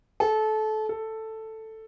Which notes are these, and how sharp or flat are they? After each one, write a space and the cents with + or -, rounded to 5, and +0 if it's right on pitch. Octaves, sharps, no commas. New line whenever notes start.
A4 -25
A4 +5